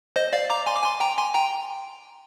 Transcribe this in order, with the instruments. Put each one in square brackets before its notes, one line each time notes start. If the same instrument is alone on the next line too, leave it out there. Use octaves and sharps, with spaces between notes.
[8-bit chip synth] C5 D#5
D5 F5
A#5 D6
G#5 C6
D6
G#5 C6
G5 A#5
G#5 C6
G5 A#5